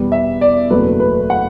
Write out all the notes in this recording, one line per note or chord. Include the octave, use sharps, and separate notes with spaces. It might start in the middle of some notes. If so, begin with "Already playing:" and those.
Already playing: E2 B2 G3 B3
E5
D5
F#1 E2 B2 F#3 A3 B4
B4
F#5